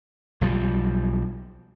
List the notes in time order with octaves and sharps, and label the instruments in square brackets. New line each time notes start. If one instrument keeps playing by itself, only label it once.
[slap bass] B1 F3 G3